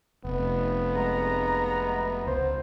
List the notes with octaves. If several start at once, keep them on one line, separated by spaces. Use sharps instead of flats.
F1 B3
G#3 A#5
C#2 C5